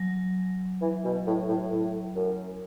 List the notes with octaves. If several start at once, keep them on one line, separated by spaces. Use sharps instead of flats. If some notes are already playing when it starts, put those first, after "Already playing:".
Already playing: F#3
E3
B2
A2
A2
A2
F#2